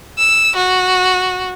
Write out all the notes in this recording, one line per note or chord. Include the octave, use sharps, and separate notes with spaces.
E6
F#4